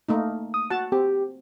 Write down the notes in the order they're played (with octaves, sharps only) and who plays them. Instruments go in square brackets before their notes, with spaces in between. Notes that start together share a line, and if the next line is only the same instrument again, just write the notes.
[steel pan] A3 A#3 D#4
[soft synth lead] D#6
[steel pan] F#4 A5 [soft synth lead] F#5
[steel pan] C4 [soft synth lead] G4